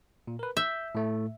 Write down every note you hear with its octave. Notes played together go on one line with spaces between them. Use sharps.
A#2
A#4 B4
E5 G6
A2 A3